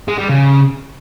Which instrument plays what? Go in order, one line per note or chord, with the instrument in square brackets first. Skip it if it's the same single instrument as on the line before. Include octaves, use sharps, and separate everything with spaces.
[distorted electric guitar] G#3
G3
C#3